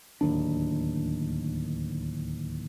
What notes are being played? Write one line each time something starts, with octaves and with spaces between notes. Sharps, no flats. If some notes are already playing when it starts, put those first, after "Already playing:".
D1 D#2 D4